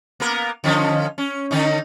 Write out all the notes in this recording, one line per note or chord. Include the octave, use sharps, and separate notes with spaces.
A#3 B3 A#4
D3 F3 C#4
C#4
D3 C#4 D#4